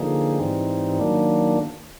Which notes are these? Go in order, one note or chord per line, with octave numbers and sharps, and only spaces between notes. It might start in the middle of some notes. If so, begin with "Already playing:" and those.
Already playing: D3 F3 A#3 D#4 G#4
G#2 E3 G3 C4 D#4
D#3 F#3 A#3 D4